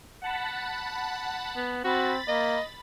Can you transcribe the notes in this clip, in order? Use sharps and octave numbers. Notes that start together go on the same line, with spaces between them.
F#5 A5 B5
B3
C4 F#4 B5 A6
A#3 D#5